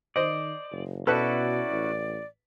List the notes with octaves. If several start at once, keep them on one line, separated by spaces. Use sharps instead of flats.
D#3 C5 D5 D#5
F#1
B2 C#4 E4 F#4 A4 B4 D5 F#6
A1